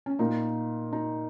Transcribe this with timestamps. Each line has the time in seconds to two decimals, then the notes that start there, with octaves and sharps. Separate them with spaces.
0.06 C#4
0.19 A#2 A#3 D#4
0.93 D#4